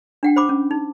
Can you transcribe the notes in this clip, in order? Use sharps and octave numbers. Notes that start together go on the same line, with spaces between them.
D4 F#5 G5
C5 B5 D6
C#4
D#4